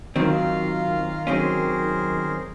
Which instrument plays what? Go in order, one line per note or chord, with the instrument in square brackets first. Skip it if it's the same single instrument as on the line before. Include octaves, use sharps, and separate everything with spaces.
[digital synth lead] D#3 [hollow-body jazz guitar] F#3 C4 [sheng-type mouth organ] F4 F5 A#5
[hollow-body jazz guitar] F#3 C4 C#4 [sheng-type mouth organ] G#4 A#4 C5